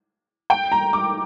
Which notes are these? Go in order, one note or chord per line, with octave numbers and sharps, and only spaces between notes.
G5
A#5
D6